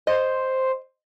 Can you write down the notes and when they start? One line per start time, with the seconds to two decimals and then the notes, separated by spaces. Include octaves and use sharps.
0.07 C5 D#5